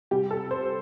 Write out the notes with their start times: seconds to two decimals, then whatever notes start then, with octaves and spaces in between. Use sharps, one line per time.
0.11 C3 G3 G4
0.31 A4
0.51 C5